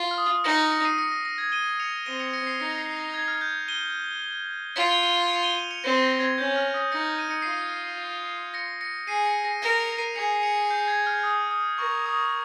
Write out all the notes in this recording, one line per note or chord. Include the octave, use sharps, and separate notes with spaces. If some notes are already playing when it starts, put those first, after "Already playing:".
Already playing: F4
F6
D#6
D#4 A#6 C#7
A#6 C#7
A#6 C#7
C7 D#7
A#6 C#7
A#6
A#6
G#6
D#7 G7
C#7 F7
C4 D#7 G7
C#7 F7
A#6 C#7
C7
D#4 A#6 C#7
C7
C7
A#6
G#6
F6
G6
D#7 G7
F4 C#7 F7
D#7 G7
G7
C#7 F7
D#7 G7
D#7 G7
C#7 F7
C4 A#6 C#7
A#6
G#6
C#4 G6
F6
D#6
D#4 A#6 C#7
D#7
C#7
F4 C7 D#7
A#6 C#7
A#6 C#7
G#4 C7 D#7
A#6 C#7
A#6
A#4
C#7 F7
C7 D#7
G#4 C#7 F7
C#7 F7
G6
G#6
F6
D#6
D#6
A#4 C#6
D#6